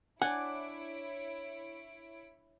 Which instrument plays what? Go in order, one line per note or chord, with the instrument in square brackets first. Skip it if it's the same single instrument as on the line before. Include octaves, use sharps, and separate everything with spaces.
[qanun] D4 [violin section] E4 C#5 D7 [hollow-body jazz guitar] F#5 [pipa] G#5